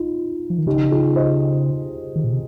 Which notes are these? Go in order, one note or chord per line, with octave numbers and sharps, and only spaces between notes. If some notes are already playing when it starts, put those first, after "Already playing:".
Already playing: D#4 F4
F3
D#3
C#3 D#4 G4
F4 G#4
C5 D#5
D#3
A#2
C3